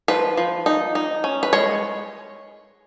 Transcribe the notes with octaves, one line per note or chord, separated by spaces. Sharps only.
F3 B4
F3
D#4
D#4
C#4
B4
G#3 C#5